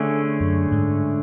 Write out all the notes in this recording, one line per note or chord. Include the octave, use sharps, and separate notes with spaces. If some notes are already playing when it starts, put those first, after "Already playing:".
Already playing: D3 A3 C#4 G#4
F#2
G#2